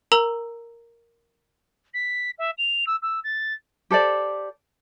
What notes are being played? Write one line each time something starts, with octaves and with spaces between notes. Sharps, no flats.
A#4 A#5 E6 F7 F#7
B6
E5
F7
E6
E6
A6
G4 A4 C5 D5